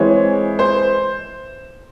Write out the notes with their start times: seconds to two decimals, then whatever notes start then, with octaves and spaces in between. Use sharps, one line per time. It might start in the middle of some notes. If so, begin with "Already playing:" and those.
Already playing: E3 G#3 C4 C#5
0.59 C5